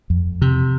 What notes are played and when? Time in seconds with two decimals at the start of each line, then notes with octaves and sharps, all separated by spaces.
0.10 F2
0.42 C3